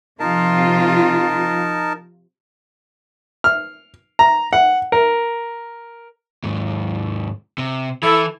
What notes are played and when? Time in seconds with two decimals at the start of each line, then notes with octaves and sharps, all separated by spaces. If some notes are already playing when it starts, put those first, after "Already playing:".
0.20 C3 F3 D#4 F4 A#4 A5
3.44 F6
4.19 A#5
4.53 F#5
4.92 A#4
6.44 D#2 G#2
7.58 C3
8.03 E3 E4 A4